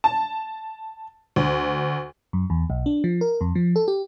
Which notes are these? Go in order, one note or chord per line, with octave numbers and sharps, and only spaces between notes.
A5
D2
F#2
E2
B1
D4
F3
A#4
F2
F3
A4
G4